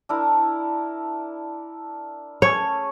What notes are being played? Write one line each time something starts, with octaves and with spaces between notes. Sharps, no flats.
D4 E4 A#4
A3 C#4 G#4 C#5